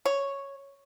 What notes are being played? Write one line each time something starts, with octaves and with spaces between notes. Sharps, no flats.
C#5